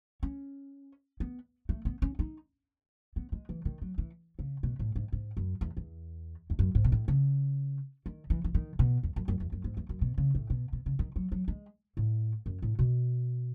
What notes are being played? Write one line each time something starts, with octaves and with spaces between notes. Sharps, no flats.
C#4
B3
A3
B3
C#4
D#4
B3
G#3
E3
D#3
F#3
E3
C#3
B2
A2
G#2
G#2
F#2
E2
E2
E2
F#2
G#2
B2
A2
C#3
D#3
E3
E3
D#3
B2
E2
F#2
F#2
E2
F#2
G#2
E2
F#2
B2
C#3
A2
B2
B2
C#3
D#3
F#3
F#3
G#3
A2
F#2
A2
B2